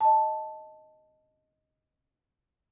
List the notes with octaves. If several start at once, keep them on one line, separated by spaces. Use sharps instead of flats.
D#5 A5